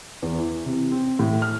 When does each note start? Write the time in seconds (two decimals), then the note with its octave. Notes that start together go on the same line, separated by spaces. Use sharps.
0.22 E2
0.38 E3
0.66 C3
0.91 C4
1.19 A2
1.42 F6